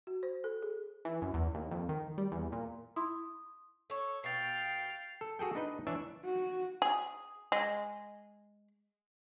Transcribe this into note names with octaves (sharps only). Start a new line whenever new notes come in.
F#4
C5
A4
G#4
E3
F#2
E2
D#2
F2
D#3
G3
E2
A#2
E4 C6 D#6
A4 C#5
B2 F5 G5 A6 C7
A4
F#4 G#4 A4 G5
D4 D#4 B4 D#5
E3 D4 C#5 E5 G#5
F#4
G#4
G#3